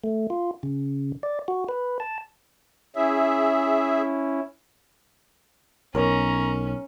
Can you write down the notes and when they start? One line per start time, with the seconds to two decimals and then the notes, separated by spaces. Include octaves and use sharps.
0.04 A3
0.30 F4
0.63 C#3
1.23 D5
1.48 F#4
1.69 B4
2.00 A5
2.96 C#4 E4 G#4 E5
5.95 B1 C#4 A#4 C#5 A#5